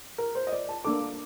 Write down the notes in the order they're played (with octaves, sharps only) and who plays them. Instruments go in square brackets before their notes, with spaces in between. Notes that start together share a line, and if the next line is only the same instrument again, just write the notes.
[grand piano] A#4
C5
D#5
D5
A5
[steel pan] A#3 D4 A4 [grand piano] D6